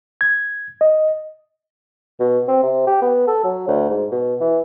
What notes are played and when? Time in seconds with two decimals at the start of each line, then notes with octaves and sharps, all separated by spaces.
0.21 G#6
0.81 D#5
2.20 B2
2.48 C4
2.63 C3
2.87 G4
3.02 B3
3.28 A4
3.44 F#3
3.68 D2
3.89 G#2
4.11 B2
4.40 E3